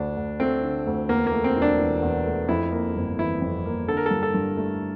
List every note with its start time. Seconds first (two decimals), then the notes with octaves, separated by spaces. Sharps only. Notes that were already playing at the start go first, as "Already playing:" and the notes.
Already playing: D2 D3 D4
0.16 D2
0.40 A3 C4
0.63 D3
0.87 D2
1.09 E2 A#3
1.27 A#3
1.32 A3
1.44 C4
1.56 E1
1.62 D4
1.79 E3
2.02 E2
2.26 A3
2.49 F2 E4
2.72 A#3
2.96 G1
3.18 E3 E4
3.42 F2
3.65 A#3
3.88 D3 A4
3.97 A#4
4.06 G2 A4
4.23 A4
4.34 G2
4.57 A3